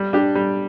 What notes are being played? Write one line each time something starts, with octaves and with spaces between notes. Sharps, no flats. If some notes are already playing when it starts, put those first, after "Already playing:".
Already playing: G3
D4 G4
G3